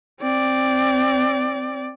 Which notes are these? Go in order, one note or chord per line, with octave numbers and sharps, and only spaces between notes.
C4 D5